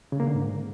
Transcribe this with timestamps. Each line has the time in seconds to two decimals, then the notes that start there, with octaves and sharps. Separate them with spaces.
0.12 C#3
0.20 A#3
0.27 D3
0.35 G#2